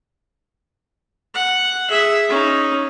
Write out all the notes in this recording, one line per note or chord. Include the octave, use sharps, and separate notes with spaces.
F#5
G#4 E5
C#4 D#4